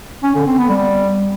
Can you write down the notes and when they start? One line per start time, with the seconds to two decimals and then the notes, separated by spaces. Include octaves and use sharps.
0.23 C#4
0.35 D3
0.46 C4
0.58 B3
0.69 G3